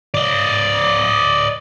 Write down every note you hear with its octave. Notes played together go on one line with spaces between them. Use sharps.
D5 D#5